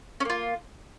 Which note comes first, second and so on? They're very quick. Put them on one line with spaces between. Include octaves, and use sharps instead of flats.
C#4 A#3 F4